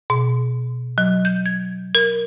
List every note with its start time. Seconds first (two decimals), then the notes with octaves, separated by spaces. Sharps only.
0.10 B2
0.98 F#3
1.25 G6
1.46 G#6
1.95 A#4